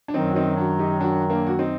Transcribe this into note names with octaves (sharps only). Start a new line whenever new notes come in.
D4
F#2 D#3 F#3 C4 D#4
F#4
C4 D#4
D4 F#4
D#4 G4
D4 F#4
A#3 D4
F#4
C4 D#4